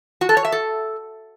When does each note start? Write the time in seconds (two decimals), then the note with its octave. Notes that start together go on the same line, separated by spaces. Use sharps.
0.21 F#4
0.29 A4
0.37 C#5
0.45 E5
0.52 A4